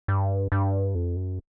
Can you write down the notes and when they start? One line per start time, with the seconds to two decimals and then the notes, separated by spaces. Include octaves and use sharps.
0.08 G2
0.52 G2
0.95 F2
1.16 F#2